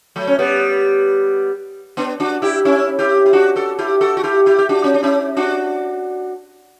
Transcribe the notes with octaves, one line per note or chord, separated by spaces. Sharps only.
F#3 A3
C#4
G3 B3
B3 D4
D4 F#4
E4 G4
C#4 E4
E4 G4
E4
D4 F#4
F#4 A4
E4 G4
F#4 A4
F#4
E4 G4
E4 G4
G4
D4 F#4
C#4
D4
C#4 E4
D4 F#4